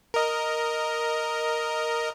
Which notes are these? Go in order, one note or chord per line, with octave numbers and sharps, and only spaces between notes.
A#4 D#5